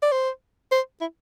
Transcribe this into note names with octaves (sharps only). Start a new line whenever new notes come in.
D5
C5
C5
E4